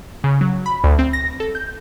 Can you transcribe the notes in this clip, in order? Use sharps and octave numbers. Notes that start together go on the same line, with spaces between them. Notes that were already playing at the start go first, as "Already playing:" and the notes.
C#3
F#3
B5
D2
C4
A#6
A4
G6